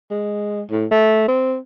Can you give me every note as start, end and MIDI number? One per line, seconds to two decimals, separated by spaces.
0.11 0.62 56
0.70 0.86 45
0.91 1.25 57
1.28 1.57 60